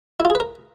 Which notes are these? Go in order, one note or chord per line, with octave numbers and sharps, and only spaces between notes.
E4
F4
G#4
B4
A#4